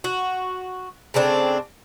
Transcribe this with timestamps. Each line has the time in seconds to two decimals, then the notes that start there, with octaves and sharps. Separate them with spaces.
0.04 F#4
1.14 C#3 A3 C4 D4